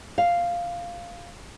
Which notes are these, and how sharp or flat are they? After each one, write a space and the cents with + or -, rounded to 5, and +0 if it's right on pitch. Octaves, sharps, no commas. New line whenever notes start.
F5 -5